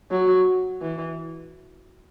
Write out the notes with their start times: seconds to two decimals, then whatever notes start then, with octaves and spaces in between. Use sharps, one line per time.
0.11 F#3
0.82 E3